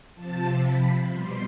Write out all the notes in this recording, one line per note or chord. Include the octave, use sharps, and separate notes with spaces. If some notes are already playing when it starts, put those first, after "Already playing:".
C3 F3 A5
B5
B2 G3 C6